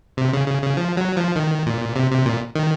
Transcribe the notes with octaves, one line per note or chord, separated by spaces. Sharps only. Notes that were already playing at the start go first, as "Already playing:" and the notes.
C3
C#3
C#3
C#3
F3
F#3
F3
D#3
A#2
C3
C3
A#2
D#3